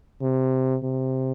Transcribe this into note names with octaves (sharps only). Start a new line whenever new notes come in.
C3
C3